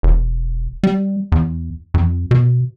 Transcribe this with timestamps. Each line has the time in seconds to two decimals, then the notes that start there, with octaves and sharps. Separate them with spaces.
0.03 E1
0.83 G3
1.32 E2
1.94 F2
2.31 B2